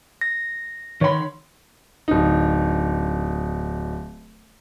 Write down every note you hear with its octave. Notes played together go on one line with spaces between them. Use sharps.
A#6
D#3 C#5 B5 C6
D1 D#4